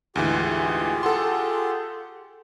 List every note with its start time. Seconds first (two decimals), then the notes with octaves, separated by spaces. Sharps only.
0.16 D2 G#2 E3 F4 G4 G#4
1.03 A4 F#5 C6